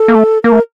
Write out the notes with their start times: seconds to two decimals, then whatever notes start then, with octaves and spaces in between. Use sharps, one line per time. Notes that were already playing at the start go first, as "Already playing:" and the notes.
Already playing: A4
0.08 A#3
0.15 A3
0.44 A#3 A#4
0.52 A3